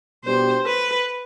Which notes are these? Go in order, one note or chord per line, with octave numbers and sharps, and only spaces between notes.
B2 G3 B3 D4 G4 C5
B4